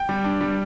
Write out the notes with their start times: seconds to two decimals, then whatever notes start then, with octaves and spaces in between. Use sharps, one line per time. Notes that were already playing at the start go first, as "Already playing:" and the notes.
Already playing: G5
0.09 G3
0.24 D4
0.41 G3